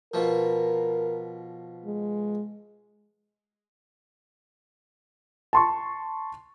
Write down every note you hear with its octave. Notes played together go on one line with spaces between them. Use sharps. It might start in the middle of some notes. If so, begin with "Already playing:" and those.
B2 F3 A#4
G#3
A5 C6 C#6